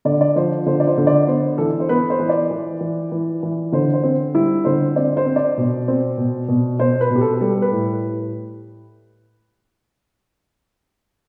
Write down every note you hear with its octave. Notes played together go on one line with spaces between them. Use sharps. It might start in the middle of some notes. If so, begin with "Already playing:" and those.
D3 D5
D5
F3 C5
D3 C5
D5
C5
D3
D5
B3 C5
E3 A4
C5
B3 B4
C5
E3
D5
E3
E3
E3
E3
D3 C5
C5
C4
G3 E4
D3 C5
C4 D5
C5
C4
D5
B2
C4
B2
B2
B2 C5
B4
B2 G4
A4
G3 A4
B4
A2